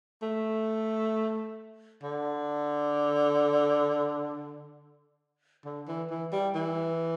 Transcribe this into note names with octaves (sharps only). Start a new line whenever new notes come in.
A3
D3
D3
E3
E3
G3
E3